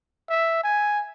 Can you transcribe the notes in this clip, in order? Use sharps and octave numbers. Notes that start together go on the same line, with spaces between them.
E5
G#5